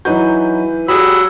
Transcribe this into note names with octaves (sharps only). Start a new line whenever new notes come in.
E3 F#3 D#4 F#4 B4 G6
F#3 G4 G#4 B5 D#6 E6